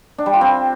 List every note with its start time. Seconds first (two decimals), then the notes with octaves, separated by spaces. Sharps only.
0.18 D4
0.26 G3
0.33 F4
0.41 C4